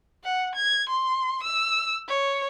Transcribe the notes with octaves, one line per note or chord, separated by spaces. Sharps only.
F#5
G#6
C6
E6
C#5